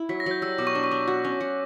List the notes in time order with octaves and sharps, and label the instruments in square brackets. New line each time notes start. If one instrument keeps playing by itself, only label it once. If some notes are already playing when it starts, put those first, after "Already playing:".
Already playing: [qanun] E4
[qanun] F#3 [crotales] B6
[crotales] A#6
[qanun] F#3 [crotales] G6
[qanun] G3 [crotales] E6
[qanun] B2 [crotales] D6
[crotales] C#6
[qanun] D4 [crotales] D6
[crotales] C#6
[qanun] D4 [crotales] D6
[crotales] C#6
[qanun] F#4
C#4
F#4